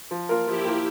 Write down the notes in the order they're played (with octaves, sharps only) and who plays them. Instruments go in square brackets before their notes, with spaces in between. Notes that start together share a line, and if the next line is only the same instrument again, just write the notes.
[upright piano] F3
A#3 F4 A#4
[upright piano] F3 [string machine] E4 G4
[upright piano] A#3 F4 A#4